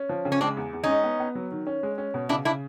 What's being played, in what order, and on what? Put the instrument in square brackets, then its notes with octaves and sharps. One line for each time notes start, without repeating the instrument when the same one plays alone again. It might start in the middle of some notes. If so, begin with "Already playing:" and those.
Already playing: [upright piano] C#4
F3
C#3
[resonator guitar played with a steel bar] C#4
[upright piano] G#3 [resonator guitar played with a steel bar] C4 D4
[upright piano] E2
E2
[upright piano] G#3 [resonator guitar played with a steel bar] C#4 D#4
[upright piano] B3
B3
F#3
D#3
C#4
G#3
C#4
B2
[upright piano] C#3 [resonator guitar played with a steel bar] D4 E4
[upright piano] C#3 [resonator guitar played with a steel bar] D4 E4